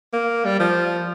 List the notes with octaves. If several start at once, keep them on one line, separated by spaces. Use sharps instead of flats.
A#3
G3
F3